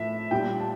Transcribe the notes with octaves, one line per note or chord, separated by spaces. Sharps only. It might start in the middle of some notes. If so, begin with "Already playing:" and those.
Already playing: A2 F3 A3 E5
A#2 G3 G5
A5